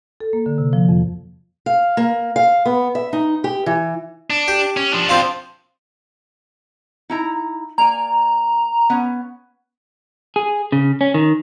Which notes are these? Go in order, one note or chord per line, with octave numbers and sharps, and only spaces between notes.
A4
A#3
D3
C3
F3
F2
F5
A#3
F5
B3
E5
D#4
G4
E3
D4
G4
C#4
F3 D4
C4 F4 F5
D#4 E4 A#5
A#3 D5 G#5 A#5
B3 C#4
G#4
C#3
C#4
D#3